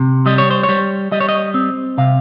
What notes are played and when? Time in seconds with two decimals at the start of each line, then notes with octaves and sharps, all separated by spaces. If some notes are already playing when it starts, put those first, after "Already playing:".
Already playing: C3
0.26 G3 D#5
0.38 C#5
0.51 C5
0.63 C#5
0.69 G3
1.12 G3 D#5
1.20 C#5
1.29 D#5
1.54 C4
1.98 C3 F5